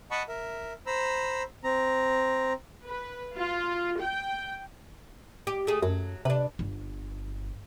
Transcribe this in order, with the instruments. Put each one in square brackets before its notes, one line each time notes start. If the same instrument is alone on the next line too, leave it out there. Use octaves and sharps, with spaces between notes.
[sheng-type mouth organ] D#5 F#5 A5 B5 C#6
A#4 E5
C5 A#5 B5 E6
C4 A#5
[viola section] B4
F4
G5
[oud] G4
A3 G#4
[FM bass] F#2 [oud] F#3
[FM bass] C3 [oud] D4 B4
[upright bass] G1